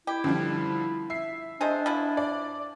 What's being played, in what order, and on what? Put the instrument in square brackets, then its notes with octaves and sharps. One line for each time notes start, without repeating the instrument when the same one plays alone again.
[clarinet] E4 [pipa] G4
[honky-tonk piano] D3 F3 G3
E5 C7
[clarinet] D4 [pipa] D#4 G#4 C5
[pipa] F3 F#3 E4
[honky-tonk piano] D5